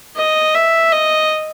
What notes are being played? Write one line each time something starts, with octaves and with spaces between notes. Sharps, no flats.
D#5
E5
D#5